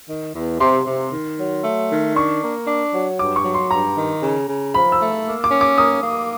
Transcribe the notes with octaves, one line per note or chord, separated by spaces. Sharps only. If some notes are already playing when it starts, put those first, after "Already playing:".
D#3
E2
C3 C6
C3
D#3
F#3
A3
D#3
D4 C#6
A#3
D4
F#3
G2 D6
C#6
F#3
C6
G2 A#5
D#3
C#3
C#3
F3 B5
E6
A3
A#3
D6
C#4
D6
A#3 D#6
A#3